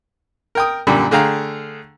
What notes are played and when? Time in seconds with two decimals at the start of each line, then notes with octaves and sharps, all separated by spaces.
0.55 A#4 G5 D#6
0.87 F#2 A#2 D3 G3
1.11 D3 A3 G#4 F5 G5 A#5